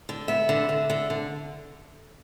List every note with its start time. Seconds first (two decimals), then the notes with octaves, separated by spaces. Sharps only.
0.09 D3
0.28 B3 E5
0.49 D3
0.69 D3
0.90 D3
1.10 D3